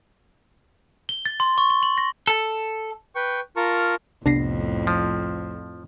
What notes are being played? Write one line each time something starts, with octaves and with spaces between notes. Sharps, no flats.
G7
A6
C6
C#6
G7
F#7
A#6
A4
B4 G5 C#6
F4 A#4 A5 A#5 C#6
C2 F2 A2 C3 B3 D4 A#6 C7
F3